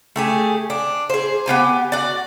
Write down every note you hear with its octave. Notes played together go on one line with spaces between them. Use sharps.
A3 G4 G#4
D4
G#4 C5
B3 F4 G4 G#5
F#4 D5